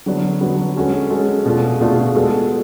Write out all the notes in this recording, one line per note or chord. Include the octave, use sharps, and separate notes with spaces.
D3 F#3 B3 D4 F#4
D3 F#3 B3 D4 F#4
G#3 C#4 F#4 A4
G#3 C#4 F#4 A4
B2 A3 D4 F4 G#4
B2 A3 D4 F4 G#4
G#3 B3 F#4 A4